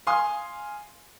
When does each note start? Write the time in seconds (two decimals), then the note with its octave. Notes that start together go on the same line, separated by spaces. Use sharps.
0.07 F5 G#5 C6 D#6